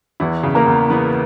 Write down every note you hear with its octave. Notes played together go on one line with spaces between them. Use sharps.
E2 E3 E4
C#3
A#3 A#4
E2
E3 B3 B4